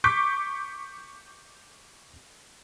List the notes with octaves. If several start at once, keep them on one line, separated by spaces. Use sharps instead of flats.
C#6 D6 G6 B6